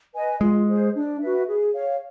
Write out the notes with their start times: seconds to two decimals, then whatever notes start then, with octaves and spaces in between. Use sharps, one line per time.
0.14 B4 D#5 G#5
0.41 G#3 F4
0.68 G#4 C5
0.95 D4
1.20 F#4 B4 E5
1.48 G#4
1.74 C#5 F5